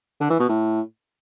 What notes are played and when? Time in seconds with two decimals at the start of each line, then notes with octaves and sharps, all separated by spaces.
0.20 D3
0.30 E3
0.39 B2
0.49 A2